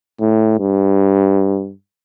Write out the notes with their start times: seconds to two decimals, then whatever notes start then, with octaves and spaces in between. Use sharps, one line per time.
0.20 A2
0.59 G2